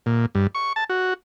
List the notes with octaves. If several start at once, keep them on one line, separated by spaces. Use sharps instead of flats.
A#2
G2
C#6
A5
F#4